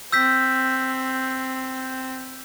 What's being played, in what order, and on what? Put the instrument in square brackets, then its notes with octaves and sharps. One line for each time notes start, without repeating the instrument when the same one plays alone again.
[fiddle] C4 [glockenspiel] E6 G6 B6